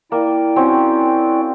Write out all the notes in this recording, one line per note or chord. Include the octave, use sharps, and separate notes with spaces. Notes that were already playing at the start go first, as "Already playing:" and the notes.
A#3 E4 D5 G5
C4 C#4 F#4